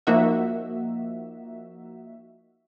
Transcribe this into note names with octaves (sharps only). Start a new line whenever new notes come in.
F3 A#3 D#4 F#4 E5